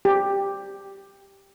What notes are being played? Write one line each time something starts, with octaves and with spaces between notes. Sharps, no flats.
G4